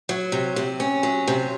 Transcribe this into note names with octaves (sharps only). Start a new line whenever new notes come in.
F#3
C3
C3
C#4
F#3
C3